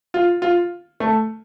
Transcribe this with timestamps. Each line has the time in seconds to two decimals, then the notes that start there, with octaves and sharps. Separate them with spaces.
0.14 F4
0.42 F4
1.00 A3